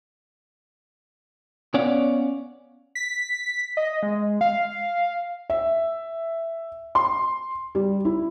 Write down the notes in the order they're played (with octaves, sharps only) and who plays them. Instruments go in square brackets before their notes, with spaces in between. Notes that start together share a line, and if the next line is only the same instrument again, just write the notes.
[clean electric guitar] B3 C#4 C#5 D5 F5 F#5
[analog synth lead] B6
D#5
G#3
F5
[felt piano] E5
C6
G3
E4